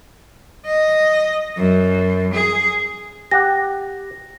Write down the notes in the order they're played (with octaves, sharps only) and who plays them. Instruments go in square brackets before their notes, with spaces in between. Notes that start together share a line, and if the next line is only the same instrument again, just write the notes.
[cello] D#5
F#2
G#4
[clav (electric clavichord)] G4 F#5 [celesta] A#6